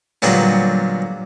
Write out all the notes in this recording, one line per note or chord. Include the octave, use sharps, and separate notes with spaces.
A#2 D3 F#3 G3 B3